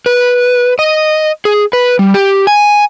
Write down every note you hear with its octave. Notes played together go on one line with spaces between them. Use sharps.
B4
D#5
G#4
B4
G3
G4
G#5